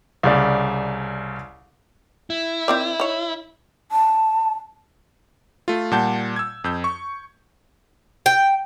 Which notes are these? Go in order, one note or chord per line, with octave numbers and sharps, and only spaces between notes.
C2 C#3 D5
E4
D#3 C4 D5
D#4 C#5
A5
A3 F4
A#2 G3 F#5 A5 G6
E6 G#6
F2 E6 G6
C#6
G5